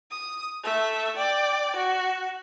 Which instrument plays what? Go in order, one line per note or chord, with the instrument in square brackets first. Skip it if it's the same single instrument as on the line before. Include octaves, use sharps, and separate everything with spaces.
[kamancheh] D#6
A3 E5
D5 G5
F#4